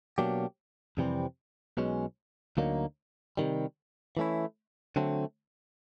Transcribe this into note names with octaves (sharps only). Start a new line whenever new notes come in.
B2 F#3 A#3 D4 G4
F2 C3 E3 G3 C4
B1 B2 G#3 C#4
D2 D3 F#3 A#3 D#4
C3 D#3 G3
E3 A3 C#4 E4
D3 F#3 A3 C4